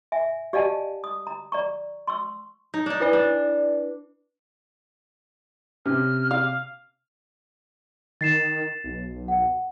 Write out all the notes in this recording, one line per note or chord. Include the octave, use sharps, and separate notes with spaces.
E5 G#5
G4 D5 D#5 F5 G#5 A5
D#6
A#5
D5 A#5 C#6
C6 C#6 E6
D#4
D4 D#4
E4 B4 D5
D4
C3 C#4 F6
F5
D#3 A6 C7 E7
B1
F#5